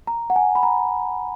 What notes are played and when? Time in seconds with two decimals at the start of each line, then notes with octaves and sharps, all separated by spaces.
0.07 A#5
0.30 F#5
0.36 G#5
0.55 B5
0.63 A#5